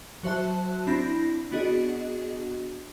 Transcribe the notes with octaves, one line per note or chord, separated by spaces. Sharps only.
F#3 F#4 C5 E5 A5 F#6
C4 D4 E4 B5 A#6
B3 D4 F#4 G#4 D#5